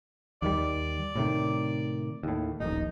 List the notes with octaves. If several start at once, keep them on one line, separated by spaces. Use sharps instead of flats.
D#2 D#3 G3 D5
A2 C3 D#3
D#2 A2
D#1 A#1 D#4